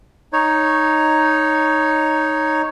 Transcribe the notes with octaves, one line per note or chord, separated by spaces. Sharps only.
D#4 C#5